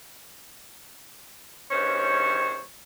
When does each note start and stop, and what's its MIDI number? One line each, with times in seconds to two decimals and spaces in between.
1.71 2.62 40
1.71 2.62 43
1.71 2.62 51
1.71 2.62 61
1.71 2.62 72
1.71 2.62 73